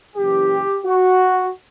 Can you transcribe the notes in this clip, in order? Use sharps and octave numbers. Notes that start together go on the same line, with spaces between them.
F#1 F#2 E3 G4
F#4